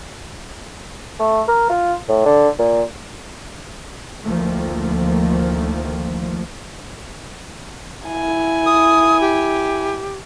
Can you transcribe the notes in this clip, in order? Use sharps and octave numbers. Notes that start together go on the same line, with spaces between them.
A3
A#4
F4
A2
D3
A#2
D2 D#3 F3 A3 A#3
E4 G#5
D#6
G4